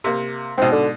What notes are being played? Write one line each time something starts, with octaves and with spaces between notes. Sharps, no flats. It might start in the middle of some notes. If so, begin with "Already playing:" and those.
C3 A#3
G#2 B2 C4
D3